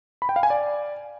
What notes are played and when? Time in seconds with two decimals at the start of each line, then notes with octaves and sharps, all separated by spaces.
0.22 B5
0.29 G5
0.36 F5
0.43 G#5
0.50 D5